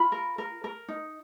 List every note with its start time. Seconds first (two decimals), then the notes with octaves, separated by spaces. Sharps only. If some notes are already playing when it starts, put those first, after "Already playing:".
Already playing: F4 B5
0.12 A#4
0.38 A#4
0.64 A#4
0.88 D#4